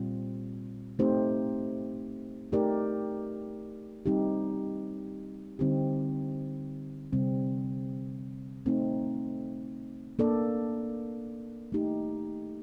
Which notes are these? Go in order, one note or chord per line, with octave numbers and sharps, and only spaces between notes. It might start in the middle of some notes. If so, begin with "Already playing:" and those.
Already playing: A#2 G3 C4 F4
A3 C4 D#4 G4 C5
A3 D#4 G4 A#4 D5
G3 C4 D#4 G4
D3 G3 C4 D#4 G4
C3 G3 C4
A3 C4 D#4
A#3 D4 A4 D5
A3 D#4 G4